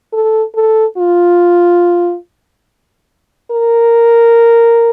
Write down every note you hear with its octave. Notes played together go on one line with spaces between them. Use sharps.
A4
A4
F4
A#4